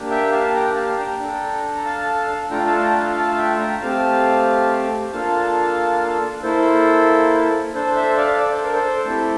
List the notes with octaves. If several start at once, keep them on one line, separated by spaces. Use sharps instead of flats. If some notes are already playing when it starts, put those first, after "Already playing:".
Already playing: A#3 D4 G4
E5 G5
F5 A5
G5 A#5
F5 A5
G5 A#5
D4 A4
A#5
F5 A5
A3 D4 F4 A4 G5 A#5
F5 A5
G5 A#5
F5 A5
F5 A5
E5 G5
G5 A#5
A3 C4 G4 F5 A5
A#3 D4 F4 A4 F5 A5
A#3 E4 A4 C5
D4 A4 C5
C5 E5
D5 F5
D5
C5
A#4
A4 C5
A3 C4 E4 G4